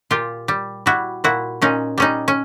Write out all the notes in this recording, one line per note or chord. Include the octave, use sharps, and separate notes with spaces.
A#2 F4 G4
G3
G3 E4 F#4
A#2 E4 F#4
A#2 C#4 D#4
G3 C#4 D#4
C#4